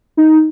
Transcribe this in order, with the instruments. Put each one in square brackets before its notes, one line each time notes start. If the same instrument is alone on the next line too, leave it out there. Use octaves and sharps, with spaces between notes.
[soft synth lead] D#4